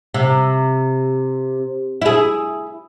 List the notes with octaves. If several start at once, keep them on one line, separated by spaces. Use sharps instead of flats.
C3
E4 G#4